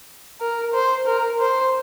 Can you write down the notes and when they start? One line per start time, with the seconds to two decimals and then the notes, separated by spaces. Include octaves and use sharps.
0.40 A#4
0.73 C5
1.07 A#4
1.39 C5